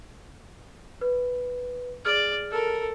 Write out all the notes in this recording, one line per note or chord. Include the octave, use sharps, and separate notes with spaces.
B4
G#4 D5 F6
A4 A#4